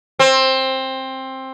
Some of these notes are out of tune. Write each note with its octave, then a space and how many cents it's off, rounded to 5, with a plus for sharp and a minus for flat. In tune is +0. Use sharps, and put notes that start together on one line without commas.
C4 +15